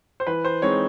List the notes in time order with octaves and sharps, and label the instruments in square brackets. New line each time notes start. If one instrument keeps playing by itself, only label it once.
[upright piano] C5
E3 B4
C5
G#3 C4 D#4 C#5